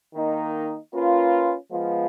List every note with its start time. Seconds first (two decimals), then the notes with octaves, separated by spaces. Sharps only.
0.14 D#3 A#3 D#4
0.92 A#3 C#4 F4 B4
1.70 F3 G#3 B3 F4